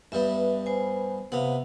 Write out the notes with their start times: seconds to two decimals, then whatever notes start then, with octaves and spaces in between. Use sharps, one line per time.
0.12 G2 G3 B3 E5
0.66 C5 G#5
1.32 C3 B3 F5 F#5